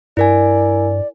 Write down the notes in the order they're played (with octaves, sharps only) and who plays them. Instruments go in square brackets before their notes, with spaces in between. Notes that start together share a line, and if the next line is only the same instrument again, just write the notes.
[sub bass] G2 [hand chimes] E4 A#4 G#5 [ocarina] D5